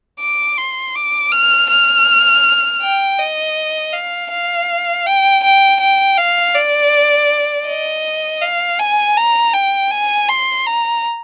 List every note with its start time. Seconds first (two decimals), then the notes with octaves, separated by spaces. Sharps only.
0.20 D6
0.58 C6
0.95 D6
1.32 F6
1.70 F6
2.82 G5
3.20 D#5
3.94 F5
4.31 F5
5.06 G5
5.44 G5
5.81 G5
6.18 F5
6.55 D5
7.68 D#5
8.42 F5
8.79 G#5
9.17 A#5
9.54 G5
9.91 G#5
10.29 C6
10.67 A#5